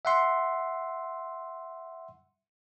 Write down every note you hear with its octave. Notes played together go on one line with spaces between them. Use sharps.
E5 F#5 C6